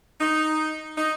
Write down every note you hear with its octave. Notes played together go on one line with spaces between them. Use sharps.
D#4
D#4